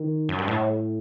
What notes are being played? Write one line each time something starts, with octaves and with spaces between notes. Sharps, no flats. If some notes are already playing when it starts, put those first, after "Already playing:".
Already playing: D#3
F#2
G2
A2